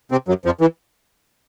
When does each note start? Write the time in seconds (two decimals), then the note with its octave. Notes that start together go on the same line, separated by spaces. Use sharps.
0.12 C3 C4
0.28 F#2 F#3
0.45 F2 F3
0.61 E3